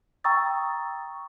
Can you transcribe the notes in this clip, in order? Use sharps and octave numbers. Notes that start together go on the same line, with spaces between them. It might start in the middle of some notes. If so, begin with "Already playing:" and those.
G5 A#5 C#6 D#6 E6 A6